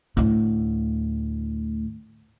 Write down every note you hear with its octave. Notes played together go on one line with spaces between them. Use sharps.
D2 A2